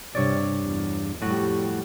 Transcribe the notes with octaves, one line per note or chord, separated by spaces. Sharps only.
G2 C3 C#5 D5
E2
F2 A2 G3 F#4